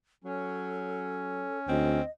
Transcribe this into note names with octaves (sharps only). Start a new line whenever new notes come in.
F#3 C#4 A4
D2 C4 D#5